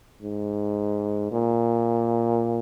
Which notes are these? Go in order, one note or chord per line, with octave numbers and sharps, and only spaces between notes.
G#2
A#2